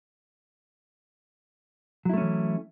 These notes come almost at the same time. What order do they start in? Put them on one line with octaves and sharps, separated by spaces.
F#3 E4 A3 C#4 E3